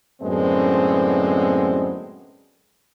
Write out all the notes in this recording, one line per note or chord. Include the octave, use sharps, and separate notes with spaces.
F#2 A2 D3 G#3 B3 C4